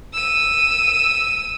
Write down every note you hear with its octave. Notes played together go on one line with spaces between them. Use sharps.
E6 D#7